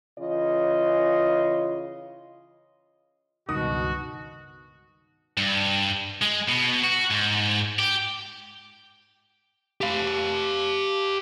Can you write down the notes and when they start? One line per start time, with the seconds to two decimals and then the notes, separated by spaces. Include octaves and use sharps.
0.19 C#3 E3 F4 C#5 D#5
3.49 C#2 G2 B2 D#3 F#4 D#6
5.37 G2
6.22 G#3
6.49 B2
6.84 F#4
7.11 G#2
7.79 G4
9.81 G4 F5